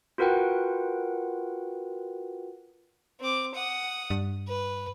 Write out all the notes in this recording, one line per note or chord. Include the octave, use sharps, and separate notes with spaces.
F4 F#4 A#4 B4 F#5 G5
C4 D6
F#5 D#6
G2
B4